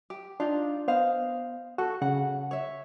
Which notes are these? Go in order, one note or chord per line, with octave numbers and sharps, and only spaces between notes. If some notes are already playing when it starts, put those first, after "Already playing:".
G4
D4 D#4 F4
B3 C5 D#5 F5
F#4 A4
C#3 F#5
C#5 E5